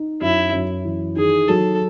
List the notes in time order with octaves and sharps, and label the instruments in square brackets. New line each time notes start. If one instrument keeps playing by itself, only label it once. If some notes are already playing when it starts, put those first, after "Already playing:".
Already playing: [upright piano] D#4
[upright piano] F#2 [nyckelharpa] E4
[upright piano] F#2
E3
[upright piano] D#3 [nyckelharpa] G#4
[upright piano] F#3 [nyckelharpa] A4